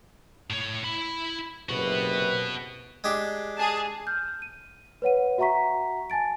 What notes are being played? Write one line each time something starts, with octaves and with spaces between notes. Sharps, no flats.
A2 C#5
E4 B5
F#1 C3 B3 F#4 B4
G#3 D4 G4
G#4 A5
F6 G6
D#7
B4 C#5 F#5 D#7
F#4 E5 F#5 A#5 C#6 B6
G#5 A5 A6 D7